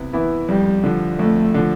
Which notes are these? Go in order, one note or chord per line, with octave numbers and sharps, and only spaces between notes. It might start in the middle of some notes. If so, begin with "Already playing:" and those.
Already playing: C3 B3 E4
E3 B3 E4
F2 G3
D3 F3
F2 A3
D3 F3